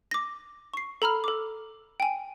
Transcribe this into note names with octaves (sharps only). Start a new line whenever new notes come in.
D6 A#6
C#6 C7
A4 A#5 B5 F6
A4 D6
G5 G#5